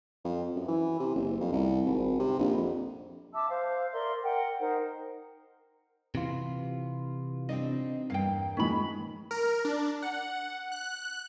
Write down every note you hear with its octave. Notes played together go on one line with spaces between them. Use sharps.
F2
F#2
E3
C3
F#1
F2
C2
G#1
C3
A#1
F2
E5 A5 D6 E6
C5 F5
A#4 D5 E5 C6
A#4 F#5 G5
D#4 A#4 C5
C3 E3 F4
C4 D4 D#4 D#5
E2 G2 A#3 F5 G5
D#3 F3 G#3 C#4 B5
A#4
D4
F#5
F#6